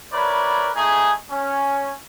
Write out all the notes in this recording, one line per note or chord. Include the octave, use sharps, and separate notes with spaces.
E4 A#4 B4 C#5 D5
A3 D#4 G#4
C#4